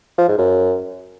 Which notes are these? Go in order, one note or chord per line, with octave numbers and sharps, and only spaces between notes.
F3
G#2
F#2